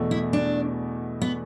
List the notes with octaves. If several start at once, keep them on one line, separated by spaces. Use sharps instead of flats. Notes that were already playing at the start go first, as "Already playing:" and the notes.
Already playing: E2 B2 A3
E4
D4
B3